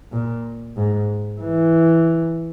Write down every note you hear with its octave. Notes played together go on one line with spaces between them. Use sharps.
A#2
G#2
E3